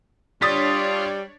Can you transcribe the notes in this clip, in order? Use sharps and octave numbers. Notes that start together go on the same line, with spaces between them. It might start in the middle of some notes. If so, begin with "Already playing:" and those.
G3 D4 F4 C#5 D5 D#6 A6 B6